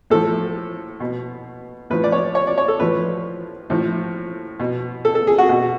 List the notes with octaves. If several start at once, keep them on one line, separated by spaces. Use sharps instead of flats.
A2 F3 A4
B2
A2 F3 B4
D5
C#5
C#5
D5
C#5
A4
A2 F3 B4
A2 F3
B2
A4
A4
G#4
F#4
B2 F#4